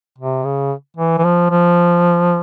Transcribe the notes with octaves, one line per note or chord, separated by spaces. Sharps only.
C3
C#3
E3
E3
F3
F3